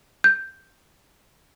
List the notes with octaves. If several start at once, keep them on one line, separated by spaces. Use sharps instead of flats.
G6